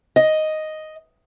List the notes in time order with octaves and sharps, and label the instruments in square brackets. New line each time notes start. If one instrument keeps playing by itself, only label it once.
[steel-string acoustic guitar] D#5